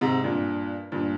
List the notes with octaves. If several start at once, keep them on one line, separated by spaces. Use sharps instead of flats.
G#2 C3
G2 A#2
G2 A#2